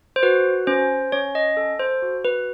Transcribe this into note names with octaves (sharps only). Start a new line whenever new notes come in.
C5
F#4 B4
C#4 C5
C#4 C#5
D#5
A4
C5
F#4
B4